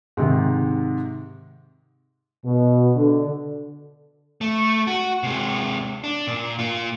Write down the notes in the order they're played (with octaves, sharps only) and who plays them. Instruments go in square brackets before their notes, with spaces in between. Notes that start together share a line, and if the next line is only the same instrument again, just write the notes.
[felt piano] G#2 C3 D#3
[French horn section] B2
D3
[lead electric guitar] A3
F#4
C3 G#3
D4
A#2
A#3 F4